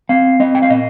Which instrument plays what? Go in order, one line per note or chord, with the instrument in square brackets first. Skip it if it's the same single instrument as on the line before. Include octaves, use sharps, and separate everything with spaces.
[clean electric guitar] C4 F5
C4 D#5
G5
F5
A#2 D#5